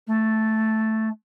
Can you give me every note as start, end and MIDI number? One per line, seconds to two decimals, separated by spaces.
0.07 1.09 57